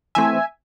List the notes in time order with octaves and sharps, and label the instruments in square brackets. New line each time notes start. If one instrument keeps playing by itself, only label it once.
[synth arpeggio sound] E3 A3 C4 E5 G#5